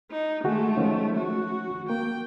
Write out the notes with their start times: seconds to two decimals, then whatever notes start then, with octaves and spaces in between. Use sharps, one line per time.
0.11 D#4
0.44 D#3 G#3 A3 F#4 G#4
0.77 D#3 F3 C#4
1.17 F#4
1.90 A#3 G5